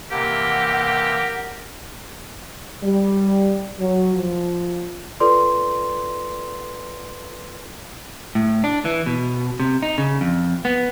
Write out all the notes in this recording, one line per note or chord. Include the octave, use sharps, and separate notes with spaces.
C3 E3 A#3 G4 A#4 F#5
G3
F#3
F3
F4 A4 B4 D5 C6
A2
D4
E3
B2
C3
D#4
C#3
F2
B3